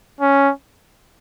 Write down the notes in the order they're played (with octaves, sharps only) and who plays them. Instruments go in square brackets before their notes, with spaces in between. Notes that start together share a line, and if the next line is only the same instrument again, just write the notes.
[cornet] C#4